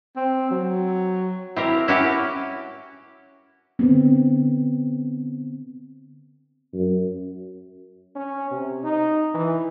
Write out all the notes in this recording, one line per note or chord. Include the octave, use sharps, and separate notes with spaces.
C4
F#3
C4 E4 G4 A#4
C#4 E4 F#4 G4
D3 B3 C4
F#2
C#4
C3
D#4
E3